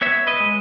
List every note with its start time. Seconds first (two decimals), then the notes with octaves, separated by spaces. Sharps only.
0.01 B3 C#5 E5
0.27 B4 D#5
0.40 G#3